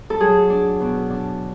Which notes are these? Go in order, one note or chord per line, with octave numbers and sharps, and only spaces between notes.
A4
F#3 G#4
D4
B2
D4